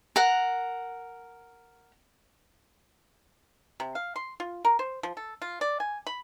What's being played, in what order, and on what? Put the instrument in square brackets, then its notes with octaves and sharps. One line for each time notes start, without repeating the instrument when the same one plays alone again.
[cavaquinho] A#4 F#5
[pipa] C3
F5
C6
F4
A#4
C5
F3
A4
F4
D5
G#5
B5